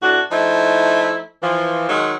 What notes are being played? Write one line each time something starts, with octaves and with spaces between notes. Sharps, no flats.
A2 D4 F#4
F3 A3 D#4 E4
E3 F3
D#3 F#3 G#3